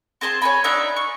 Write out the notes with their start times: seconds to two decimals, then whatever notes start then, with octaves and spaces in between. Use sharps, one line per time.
0.21 C4 G#4 C5 A5
0.42 C#5 G#5 B5
0.64 D4 D#4 E5
0.96 C#6